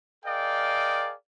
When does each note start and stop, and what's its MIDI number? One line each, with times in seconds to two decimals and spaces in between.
0.25 1.13 68
0.25 1.13 70
0.25 1.13 74
0.25 1.13 75
0.25 1.13 77
0.25 1.13 79